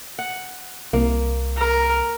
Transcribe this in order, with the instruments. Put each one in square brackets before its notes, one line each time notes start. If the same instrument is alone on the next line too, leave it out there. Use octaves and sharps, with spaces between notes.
[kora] F#5
[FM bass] C2 [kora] A#3
[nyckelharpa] A#4